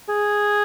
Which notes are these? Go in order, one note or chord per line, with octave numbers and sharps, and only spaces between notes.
G#4